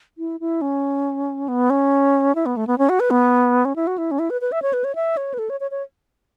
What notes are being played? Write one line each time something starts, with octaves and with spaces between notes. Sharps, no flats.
E4
E4
C#4
B3
C#4
E4
B3
A3
B3
C#4
F#4
B4
B3
C#4
E4
F#4
E4
C#4
E4
B4
B4
E5
C#5
B4
C#5
E5
C#5
B4
A4
C#5
C#5
C#5